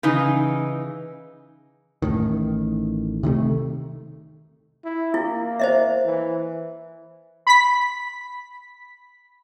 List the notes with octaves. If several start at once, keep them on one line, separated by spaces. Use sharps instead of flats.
C#3 E3 D#4
A1 A2 D#3
C3 D#3 G3 A3
E4
A#3 E4
C5 D#5 E5
E3
B5 B6